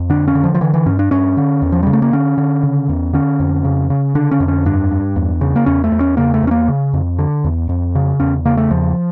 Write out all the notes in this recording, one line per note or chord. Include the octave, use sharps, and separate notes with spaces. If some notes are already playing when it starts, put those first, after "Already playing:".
Already playing: F2
D3 D4
C#4
D3
F3
F3
D3 E3
E3
G2 C#4
D4
G2 C#4
D3
E2
F3
C#3 G3
A3
A#3
D3 C#4
D3
C#3
E2
D3 C#4
F2
C#3
C#3
D3 D4
C#4
F2
C#4
G2 D4
G2
E2
C#3
A#3
E2 C#4
A3
E2
C#4
C#3 A#3
A3
E2 C#4
A#3
C#3
F2
D3
E2
F2
C#3
E2 C#4
C#3 A#3
A3
E2 F3